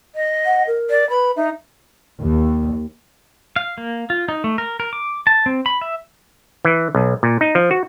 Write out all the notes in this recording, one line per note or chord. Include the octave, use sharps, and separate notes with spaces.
D#5
F#5
A#4
D5
B4 B5
D#4 E5
D#2
F5
A#3
F4
D#4
A3
A#4
A#4
D6
A5
C4
B5
E5
E3
B1
A#2
D#4
F3
F#4